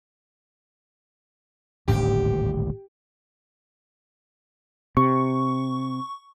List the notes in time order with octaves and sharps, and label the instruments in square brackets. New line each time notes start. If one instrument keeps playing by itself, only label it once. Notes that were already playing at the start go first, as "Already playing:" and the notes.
[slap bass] D#1 G#1 D2 [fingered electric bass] A2 C#4 D4 [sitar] G4
[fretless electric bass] C3 [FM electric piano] C#6